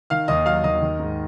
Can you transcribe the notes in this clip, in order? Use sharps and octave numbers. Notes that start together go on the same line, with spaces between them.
D#3 F5 F6
D#2 D#5 D#6
F#3 F5 F6
D#2 D#5 D#6
D#3
G#2